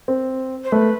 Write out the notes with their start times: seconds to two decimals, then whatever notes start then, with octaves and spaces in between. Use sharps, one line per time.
0.08 C4
0.64 C5
0.72 A3 B4